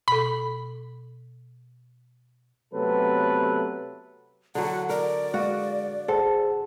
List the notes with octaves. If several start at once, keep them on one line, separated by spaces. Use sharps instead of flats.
B2 A4 B5
C3 F#3 A3 B3 A4 B4
D3 F#3 F#5
A#4 D5
G#3 F#4 F5
G#4 A4 C5 F#5